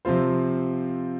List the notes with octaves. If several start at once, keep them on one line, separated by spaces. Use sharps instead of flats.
C3 F3 C4 F4 C5